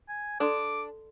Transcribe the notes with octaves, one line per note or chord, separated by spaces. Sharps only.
G#5
D4 A4 D5 C6 D6